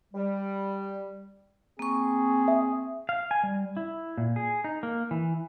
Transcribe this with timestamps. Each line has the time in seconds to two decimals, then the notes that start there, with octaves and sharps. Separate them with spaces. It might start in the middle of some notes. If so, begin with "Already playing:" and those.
0.14 G3
1.79 A#3 C4 G#4 C#6
2.48 E5
3.09 F5
3.31 G#5
3.43 G3
3.77 E4
4.18 A#2
4.36 G#4
4.64 D#4
4.83 A#3
5.11 E3